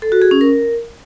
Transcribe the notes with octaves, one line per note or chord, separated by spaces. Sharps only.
A4
F#4
G#4
C#4
A#4